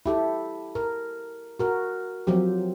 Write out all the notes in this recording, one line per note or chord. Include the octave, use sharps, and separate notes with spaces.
E4 G4 A4
A#4
F#4 A#4
F3 F#3 C4 G4